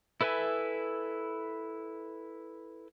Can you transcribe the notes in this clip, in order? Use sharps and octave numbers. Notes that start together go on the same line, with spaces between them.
E4 A4 B4 E5 G#5